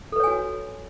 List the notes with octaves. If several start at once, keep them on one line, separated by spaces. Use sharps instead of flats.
F#4 A4 B4 C#5 G#5